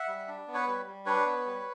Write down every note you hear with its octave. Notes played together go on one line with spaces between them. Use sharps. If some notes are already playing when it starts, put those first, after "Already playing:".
Already playing: E5 F#5
G3
D4
B3
B4 C#5
G3
G3
D4 B4 C#5
B3
G3